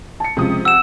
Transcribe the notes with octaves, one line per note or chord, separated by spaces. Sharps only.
A5 C#7
C#2 C3 F3 D#6
F#5 E6 E7